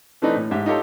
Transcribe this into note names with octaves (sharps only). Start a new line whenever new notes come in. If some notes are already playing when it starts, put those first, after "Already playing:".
E3 A3 C4 D4 D#4 B4
A2
G#2 G4 E5
D#4 F4 G4 A4 C#5